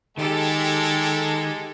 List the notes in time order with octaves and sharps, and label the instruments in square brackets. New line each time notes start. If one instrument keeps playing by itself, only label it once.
[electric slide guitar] D#3 [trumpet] G#3 [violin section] G4 A4